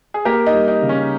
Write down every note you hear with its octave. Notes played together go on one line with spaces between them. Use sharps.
G#4
A#3 G4 A#4
D#4
G3
D#4
C#3
C#4